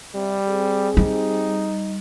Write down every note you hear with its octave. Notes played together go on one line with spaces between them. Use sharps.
C3 G3
C4 G4 G#4
G3 D#4